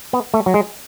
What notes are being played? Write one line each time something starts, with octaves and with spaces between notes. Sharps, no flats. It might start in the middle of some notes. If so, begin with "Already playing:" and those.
B3
A3
F#3
G#3